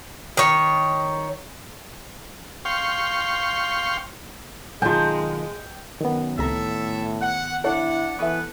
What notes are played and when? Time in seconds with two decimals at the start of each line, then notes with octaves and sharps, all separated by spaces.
0.37 D#3 C#5
2.65 F5 G5 C6 C#6
4.82 B1 D#3 G#3 F4 G5 A5
6.01 F#2 D#3 B3
6.38 C#2 A2 C3 A4 E5 A#5
7.22 F#5
7.64 D4 E4 A4 C#5 F#5
8.19 E3 B3 A4 B4 E5 C#6